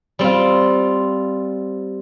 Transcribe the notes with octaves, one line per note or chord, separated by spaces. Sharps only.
G3 C4 F4